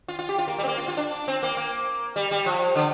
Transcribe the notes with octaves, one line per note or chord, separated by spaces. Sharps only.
F4
F4
G4
F4
A#3
G3
C4
A#3
F4
F4
D4
C4
A#3
A#3
G3
G3
F3
D3